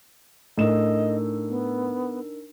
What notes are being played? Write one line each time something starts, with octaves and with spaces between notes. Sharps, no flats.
A2 D4 D#4 A#4 D#5 E7
B3